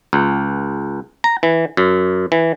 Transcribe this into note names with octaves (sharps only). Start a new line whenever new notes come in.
C#2
A#5
E3
F#2
E3